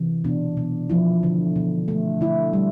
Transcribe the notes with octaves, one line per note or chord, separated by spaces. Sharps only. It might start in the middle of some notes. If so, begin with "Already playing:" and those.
Already playing: C3 E3
B2 D4
B2
F3 E4
D3
B2
A3
D3 E4
G3